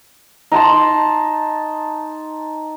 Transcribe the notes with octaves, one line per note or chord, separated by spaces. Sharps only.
D#4 A5 C6